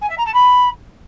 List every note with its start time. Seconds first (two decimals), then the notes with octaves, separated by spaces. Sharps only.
0.01 G#5
0.10 E5
0.18 A#5
0.26 A5
0.34 B5